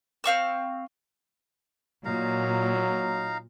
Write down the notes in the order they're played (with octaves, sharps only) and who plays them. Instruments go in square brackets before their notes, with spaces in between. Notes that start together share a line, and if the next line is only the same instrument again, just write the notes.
[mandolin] C4 F5 C#6 E6
[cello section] A#2 [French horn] F#3 [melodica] D#4 F5 A#5